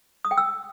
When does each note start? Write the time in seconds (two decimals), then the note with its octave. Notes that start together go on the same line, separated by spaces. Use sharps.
0.25 D#6
0.31 G5
0.38 E6